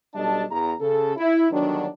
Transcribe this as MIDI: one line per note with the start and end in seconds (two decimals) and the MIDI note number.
0.15 0.44 35
0.15 0.44 55
0.15 0.44 62
0.15 0.44 69
0.15 0.44 75
0.15 0.44 81
0.51 0.73 40
0.51 0.73 82
0.81 1.16 49
0.81 1.16 69
1.17 1.47 64
1.51 1.87 31
1.51 1.87 51
1.51 1.87 54
1.51 1.87 62